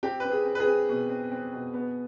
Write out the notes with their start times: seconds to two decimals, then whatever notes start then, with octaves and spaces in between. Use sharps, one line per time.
0.03 C4 G4
0.20 C4 B4
0.32 G#4
0.45 C4
0.55 B4
0.60 G#4
0.67 C4
0.89 B2
1.09 C4
1.31 C4
1.53 B2
1.74 B3